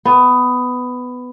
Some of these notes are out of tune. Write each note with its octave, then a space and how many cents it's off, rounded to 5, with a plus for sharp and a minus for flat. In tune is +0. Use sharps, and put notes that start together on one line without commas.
B3 +15